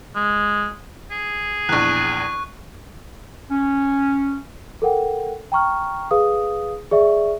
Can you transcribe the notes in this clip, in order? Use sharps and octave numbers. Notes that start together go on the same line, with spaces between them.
G#3
G#4
A#1 E2 C#6 F#6
C#4
A4 A#4 F#5 G5
G5 A#5 C#6 F6
G#4 B4 F5 D#6
G#4 D5 E5 C#6